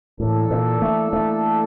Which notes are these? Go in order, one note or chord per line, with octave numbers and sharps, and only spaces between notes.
A2 E3 A#3 D4 A4
A#2
A3
A3